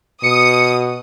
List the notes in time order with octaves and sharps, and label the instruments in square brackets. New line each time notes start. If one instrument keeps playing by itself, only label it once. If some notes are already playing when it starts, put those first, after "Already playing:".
[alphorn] B2 [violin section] D#6 [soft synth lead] C#7